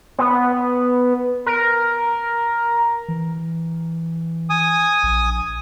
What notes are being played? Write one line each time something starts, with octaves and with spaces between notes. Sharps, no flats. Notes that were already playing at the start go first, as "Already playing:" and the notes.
B3
A#4
E3
G#5 D#6
A#1